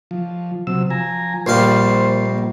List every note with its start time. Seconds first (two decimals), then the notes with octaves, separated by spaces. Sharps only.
0.11 F3
0.67 C3 F#3 E6
0.90 F3 G#5 A#5
1.46 A#1 G3 C5 F5 C6
2.25 A#3